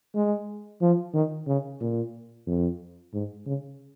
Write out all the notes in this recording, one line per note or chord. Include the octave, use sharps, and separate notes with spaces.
G#3
F3
D#3
C#3
A#2
F2
G#2
C#3